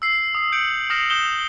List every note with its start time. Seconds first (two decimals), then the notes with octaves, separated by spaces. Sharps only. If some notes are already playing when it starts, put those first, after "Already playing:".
0.02 E6 C7
0.35 D#6 C7
0.52 G6 C#7 D7 F#7
0.90 D#6 F6 A#6 C7 E7 F7
1.10 D#6 G6 E7 G7